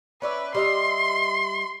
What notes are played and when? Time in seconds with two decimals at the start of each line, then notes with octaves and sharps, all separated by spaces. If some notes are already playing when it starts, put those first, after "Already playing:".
0.22 C#4 B4 D5 E5
0.55 G3 D#5 E5 C6